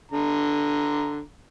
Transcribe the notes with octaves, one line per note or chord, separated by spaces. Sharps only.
D3 A#5